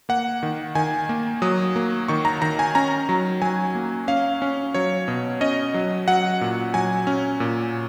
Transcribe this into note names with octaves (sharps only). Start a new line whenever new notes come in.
A#3 F#5
D#3
D#3 G#5
A#3
F#3 D#6
A#3
D#3 C#6
A#5
D#3 A#5
G#5
C#4 A#5
F#3
F#3 G#5
A#3
C#4 F5
C#4
F#3 C#5
B2
C#4 D#5
F#3
F#3 F#5
A#2
F#3 G#5
C#4
A#2